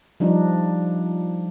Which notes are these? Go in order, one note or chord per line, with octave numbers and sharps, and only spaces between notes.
F3 G3 D4 D#4